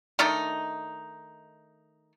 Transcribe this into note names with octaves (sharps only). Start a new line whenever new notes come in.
D#3 A3 D4 D#4